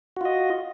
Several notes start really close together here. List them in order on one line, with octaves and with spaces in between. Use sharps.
F#4 F4 D#5